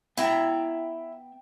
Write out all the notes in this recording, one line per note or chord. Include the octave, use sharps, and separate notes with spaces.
B3 E4 E5 G5 A#5